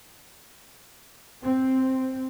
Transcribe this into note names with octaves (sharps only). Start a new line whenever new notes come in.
C4